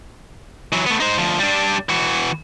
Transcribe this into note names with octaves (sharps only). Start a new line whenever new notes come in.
E3 F#3
A3 B3
D#4 C5
D2 F3
G3 D4
E3 F#4